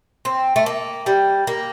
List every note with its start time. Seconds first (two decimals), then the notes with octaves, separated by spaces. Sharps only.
0.25 C4
0.56 A3
0.66 A#3
1.06 G3
1.47 A#3